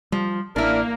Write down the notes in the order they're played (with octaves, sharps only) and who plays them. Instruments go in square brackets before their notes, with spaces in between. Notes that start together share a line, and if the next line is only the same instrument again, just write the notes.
[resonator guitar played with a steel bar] F3 [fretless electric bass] G3
[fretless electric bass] A1 [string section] A#3 [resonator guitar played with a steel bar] D4 E4 [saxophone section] A#4